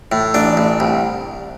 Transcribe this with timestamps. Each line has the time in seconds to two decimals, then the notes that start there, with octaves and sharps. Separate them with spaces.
0.12 A2
0.34 A1 D4
0.57 A1
0.80 C2